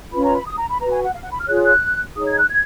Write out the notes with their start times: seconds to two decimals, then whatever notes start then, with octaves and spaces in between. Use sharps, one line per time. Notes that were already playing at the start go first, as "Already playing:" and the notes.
0.13 C#4 F4 B4 B5
0.25 A#5
0.36 B5
0.47 D#6
0.58 A#5
0.69 B5
0.81 B4 A#5
0.84 F#4
0.91 G#5
1.04 F#5
1.14 F5
1.23 F#5
1.31 B5
1.39 F6
1.48 F4 G#4 C#5 F#6
1.65 F#6
2.16 D#4 G#4 C#5 D#6
2.27 G#6
2.38 F#6
2.49 G#6